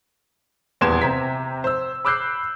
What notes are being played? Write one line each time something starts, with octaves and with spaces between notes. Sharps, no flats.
D#1 E2 B3 C6 G#6 E7
C3 C5 A#5 B6
C5 E6
B5 D6 E6 F#6 G6 C7